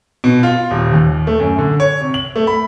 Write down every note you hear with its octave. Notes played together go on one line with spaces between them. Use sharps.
B2
F4
D#1
D#2
A3
F#2
D3
C#5
C3
F#7
A3
B5